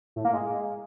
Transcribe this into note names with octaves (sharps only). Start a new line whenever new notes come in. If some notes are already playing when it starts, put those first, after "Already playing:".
A2
A#3
G#3